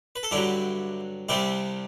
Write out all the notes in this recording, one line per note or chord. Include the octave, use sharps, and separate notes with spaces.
B4
A4
G2 D3 F#3 E4 G4
C2 C3 G3 E4 G4